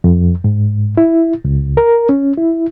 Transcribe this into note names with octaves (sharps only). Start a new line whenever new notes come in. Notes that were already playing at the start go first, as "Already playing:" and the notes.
F2
G#2
E4
C#2
A#4
C#4
E4